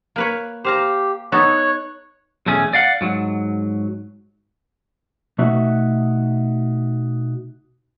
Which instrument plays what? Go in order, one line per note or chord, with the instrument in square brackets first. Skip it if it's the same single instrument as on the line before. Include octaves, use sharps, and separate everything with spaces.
[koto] A#3 B4 C#5
[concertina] G4 [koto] C5 F5 A#5
[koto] B3 D#4 A4 [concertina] C#5 C#6 F#6
[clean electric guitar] B1 E2 A3 C#4 G#4
D5 F5 F#5
G#2 F#3
B2 A3 D#4 F#4 E5